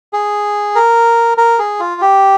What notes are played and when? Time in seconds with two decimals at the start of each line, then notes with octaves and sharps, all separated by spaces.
0.13 G#4
0.75 A#4
1.38 A#4
1.59 G#4
1.80 F4
2.01 G4